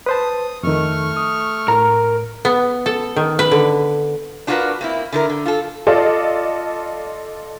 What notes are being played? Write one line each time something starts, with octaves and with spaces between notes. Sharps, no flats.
B4 C5 A5 D#6
F2 D#3 A3 C#6 F6
D#6
A2 A#4 A#5
B3
A4
D#3
B4
D3
D4 F4 F#4 G#4 A#4 B4
A#3 C4 E4
D3 E4 A#4
D3
F4 A4
F4 A4 D5 D#5